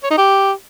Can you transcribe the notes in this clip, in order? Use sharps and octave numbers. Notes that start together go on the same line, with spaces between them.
C#5
D#4
G4